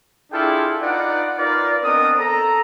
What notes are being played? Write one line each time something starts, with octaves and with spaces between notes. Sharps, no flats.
D4 E4 F4 G#4 A4 G5
D#4 F4 B4 D5 F#5
D#4 F4 A#4 B4 D5
B3 C4 D4 A#4 D#5 D#6
A4 A#5